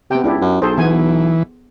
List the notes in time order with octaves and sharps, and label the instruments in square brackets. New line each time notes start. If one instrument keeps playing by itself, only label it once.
[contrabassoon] C3 [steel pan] B3 G5
[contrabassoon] C#2 [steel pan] D4 E4 G4
[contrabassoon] F#2
[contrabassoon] B1 [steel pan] G#4 A4 C5
[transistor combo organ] E3 [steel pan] B3 G#5